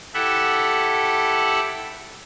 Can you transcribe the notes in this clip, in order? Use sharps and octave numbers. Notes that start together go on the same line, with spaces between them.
E4 G4 A4 E5 F#5